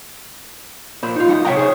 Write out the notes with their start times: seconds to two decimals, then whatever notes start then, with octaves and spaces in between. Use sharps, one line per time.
1.03 A#2 C5 B5
1.16 D#4 F4
1.28 F#2 D#4 F#5
1.45 C3 C#5 E5 F#5 G5 A#5
1.57 G#4 C5 C#5